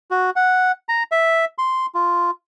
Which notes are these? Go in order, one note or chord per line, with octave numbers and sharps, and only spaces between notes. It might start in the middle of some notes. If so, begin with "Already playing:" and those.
F#4
F#5
A#5
E5
C6
F4